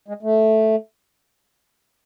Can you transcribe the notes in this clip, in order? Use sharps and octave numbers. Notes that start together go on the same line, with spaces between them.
G#3
A3